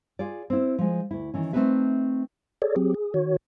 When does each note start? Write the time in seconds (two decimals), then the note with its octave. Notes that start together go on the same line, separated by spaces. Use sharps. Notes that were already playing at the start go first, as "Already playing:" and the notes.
0.19 F4 G#4 D5
0.50 C4 E4
0.78 F3 G#3
1.11 D2 E4
1.34 D#3 E3 C#4
1.53 A3 C4 D4 D#4 B4 E5
2.62 G#4 A4 C#5 D5
2.76 F#3 C4 G4 G#4
2.94 G#4
3.14 D#3 F#4 C#5